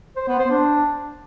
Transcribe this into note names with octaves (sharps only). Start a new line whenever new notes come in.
C5
B3
C5
D4